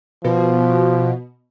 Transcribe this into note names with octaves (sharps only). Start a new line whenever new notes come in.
B2 F3